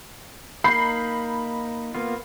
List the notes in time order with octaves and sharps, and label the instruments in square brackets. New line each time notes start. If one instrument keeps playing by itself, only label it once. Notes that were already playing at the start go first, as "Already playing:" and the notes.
[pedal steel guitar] A#3 D#4 [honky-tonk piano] B5 G6 C7
[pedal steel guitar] A#3 B3 F4